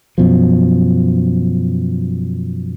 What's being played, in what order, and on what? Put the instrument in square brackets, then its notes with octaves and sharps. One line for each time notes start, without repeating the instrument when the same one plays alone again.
[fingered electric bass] F#2 B2 F3